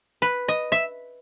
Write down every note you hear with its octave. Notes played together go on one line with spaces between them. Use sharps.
B4
D#5
E5